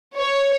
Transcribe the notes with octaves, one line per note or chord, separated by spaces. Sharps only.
C#5